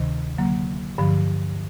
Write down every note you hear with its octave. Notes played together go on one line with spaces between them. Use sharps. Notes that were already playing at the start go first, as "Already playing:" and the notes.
Already playing: D2 C3 D#3
D3 F#3 A#3
G2 D3 F3